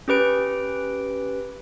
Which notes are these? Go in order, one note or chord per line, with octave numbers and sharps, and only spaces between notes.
C#4 G4 B4 D7